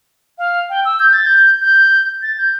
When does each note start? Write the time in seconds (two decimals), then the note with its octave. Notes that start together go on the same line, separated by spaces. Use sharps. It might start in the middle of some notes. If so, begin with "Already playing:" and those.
0.38 F5
0.70 G5
0.85 E6
1.00 G6
1.13 A6
1.26 G6
1.62 G6
2.22 A6
2.38 G6